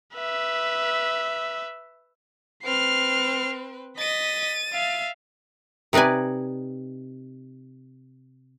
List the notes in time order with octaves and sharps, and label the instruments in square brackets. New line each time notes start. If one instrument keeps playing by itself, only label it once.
[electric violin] B4 E5
[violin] C4 B4 [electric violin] F6 C7
[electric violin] D#5 B6 [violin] A6 D#7
[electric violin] E5 F5
[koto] C3 D#4 B4 D5 G#5